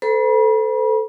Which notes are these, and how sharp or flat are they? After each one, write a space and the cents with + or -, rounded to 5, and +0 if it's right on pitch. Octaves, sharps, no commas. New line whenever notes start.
A4 +0 C5 -40 B5 -40